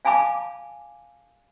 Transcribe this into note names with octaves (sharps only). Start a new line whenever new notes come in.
F5 G#5 A5 B5 D6